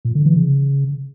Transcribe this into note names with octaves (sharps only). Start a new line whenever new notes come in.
A#2
D3
E3
C#3